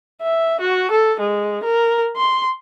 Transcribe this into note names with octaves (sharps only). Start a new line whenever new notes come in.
E5
F#4
A4
G#3
A#4
C6